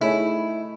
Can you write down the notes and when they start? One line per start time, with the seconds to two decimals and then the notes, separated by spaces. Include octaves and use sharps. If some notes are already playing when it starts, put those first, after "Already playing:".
0.01 A3 D#4 E4 G#4 C#5